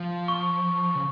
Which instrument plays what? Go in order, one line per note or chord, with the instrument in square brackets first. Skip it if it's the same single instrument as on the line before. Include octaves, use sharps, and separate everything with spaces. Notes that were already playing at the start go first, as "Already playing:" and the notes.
Already playing: [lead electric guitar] F3
[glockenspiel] C#6
[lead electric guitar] C#3